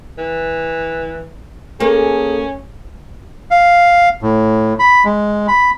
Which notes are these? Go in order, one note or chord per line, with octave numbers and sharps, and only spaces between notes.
E3
A#3 C#4 G#4 A4
F5
A2
B5
G#3
B5